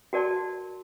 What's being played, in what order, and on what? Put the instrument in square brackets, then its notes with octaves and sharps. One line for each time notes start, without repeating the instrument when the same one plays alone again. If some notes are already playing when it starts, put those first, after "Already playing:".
[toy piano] F#4 A#4 D5 A5 C6